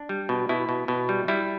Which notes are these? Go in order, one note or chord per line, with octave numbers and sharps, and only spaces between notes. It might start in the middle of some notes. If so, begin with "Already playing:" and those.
Already playing: D4
G3
B2
B2 E4
B2
B2
G3
G3 E4